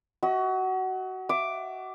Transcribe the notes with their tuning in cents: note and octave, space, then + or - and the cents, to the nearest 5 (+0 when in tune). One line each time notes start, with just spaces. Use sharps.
F#4 +20 D#5 +45
E5 +30 D6 +0